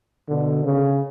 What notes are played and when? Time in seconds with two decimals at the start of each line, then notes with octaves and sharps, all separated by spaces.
0.29 B2 D3
0.65 C#3